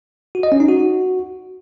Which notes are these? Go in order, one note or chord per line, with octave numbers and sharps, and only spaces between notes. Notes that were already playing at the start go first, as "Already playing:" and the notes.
F#4
D#5
C#4
D#4
F#4